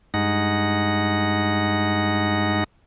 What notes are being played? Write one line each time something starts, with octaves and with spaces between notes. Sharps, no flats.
G2 G#3 D#4 F#5 A#6